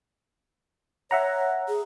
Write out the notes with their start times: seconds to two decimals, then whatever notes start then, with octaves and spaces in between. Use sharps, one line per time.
1.11 C#5 E5 F#5 A#5
1.68 G#4